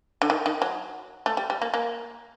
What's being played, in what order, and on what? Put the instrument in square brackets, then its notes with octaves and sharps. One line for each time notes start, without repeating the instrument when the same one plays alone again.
[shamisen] D3
D#3
D#3
F#3
A3
G3
G3
A#3
A#3